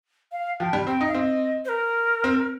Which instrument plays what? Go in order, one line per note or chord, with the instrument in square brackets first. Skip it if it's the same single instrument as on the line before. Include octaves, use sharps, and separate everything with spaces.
[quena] F5
[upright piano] F3 [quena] G5
[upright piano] G3
[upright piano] C4 [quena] G5
[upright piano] D#4
[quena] F5
[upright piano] C4 [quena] D#5
[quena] C5
A#4
[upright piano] C4